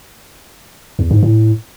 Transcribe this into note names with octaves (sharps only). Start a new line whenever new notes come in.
E2
G#2
A2